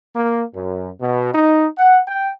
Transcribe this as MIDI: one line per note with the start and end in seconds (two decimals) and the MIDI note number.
0.14 0.43 58
0.54 0.89 42
1.01 1.32 47
1.34 1.66 63
1.78 1.99 78
2.07 2.29 79